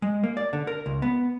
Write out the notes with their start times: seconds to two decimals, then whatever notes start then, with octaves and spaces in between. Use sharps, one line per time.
0.02 G#3
0.23 A#3
0.37 D5
0.53 D3
0.67 A#4
0.86 C#2
1.02 B3